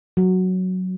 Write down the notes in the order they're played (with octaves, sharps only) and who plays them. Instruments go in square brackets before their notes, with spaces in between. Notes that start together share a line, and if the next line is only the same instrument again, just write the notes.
[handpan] F#3